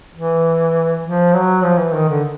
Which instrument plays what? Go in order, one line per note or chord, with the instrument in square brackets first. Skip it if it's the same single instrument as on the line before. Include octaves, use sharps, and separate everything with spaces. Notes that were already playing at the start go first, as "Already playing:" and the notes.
[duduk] E3
F3
F#3
F3
E3
D#3
D3